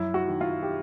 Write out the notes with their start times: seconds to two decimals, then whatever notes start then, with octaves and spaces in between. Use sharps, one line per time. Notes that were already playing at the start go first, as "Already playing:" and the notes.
Already playing: F#2 E4
0.14 F#4
0.28 D#3
0.41 F4
0.63 G4